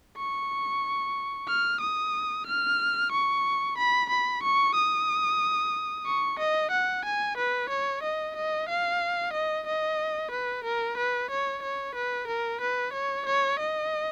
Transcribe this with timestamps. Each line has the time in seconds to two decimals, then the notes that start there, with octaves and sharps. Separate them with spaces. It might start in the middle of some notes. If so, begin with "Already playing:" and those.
0.17 C#6
1.48 F6
1.81 D#6
2.47 F6
3.12 C#6
3.78 B5
4.10 B5
4.43 C#6
4.75 D#6
6.06 C#6
6.39 D#5
6.72 F#5
7.05 G#5
7.38 B4
7.70 C#5
8.03 D#5
8.36 D#5
8.69 F5
9.33 D#5
9.67 D#5
10.32 B4
10.64 A#4
10.98 B4
11.30 C#5
11.63 C#5
11.96 B4
12.28 A#4
12.61 B4
12.93 C#5
13.27 C#5
13.60 D#5